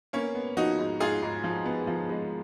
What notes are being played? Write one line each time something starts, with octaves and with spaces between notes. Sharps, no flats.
A#3 B3 C#4
B3
F3 D#4 F#4
G#2
G#2 F4 G#4
G#2
F3
B3
F3
G#3